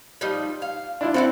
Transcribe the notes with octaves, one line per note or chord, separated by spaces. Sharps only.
F3 G3 D#4
F5
D4 E4 F4
C4 D4 E4 F#4 A4